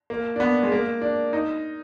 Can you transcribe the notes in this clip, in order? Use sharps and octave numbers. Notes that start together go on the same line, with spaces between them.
A#3
D4
B3
G#3
A#3
D4
D#4